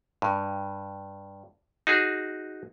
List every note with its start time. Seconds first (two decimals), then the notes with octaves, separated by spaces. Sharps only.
0.22 G2
1.87 D#4 F#4 G#4